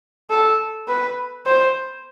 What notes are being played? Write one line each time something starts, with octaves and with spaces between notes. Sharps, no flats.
A4
B4
C5